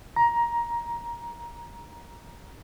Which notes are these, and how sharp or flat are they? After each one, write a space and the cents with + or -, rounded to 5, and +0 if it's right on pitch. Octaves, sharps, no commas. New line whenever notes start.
A#5 +15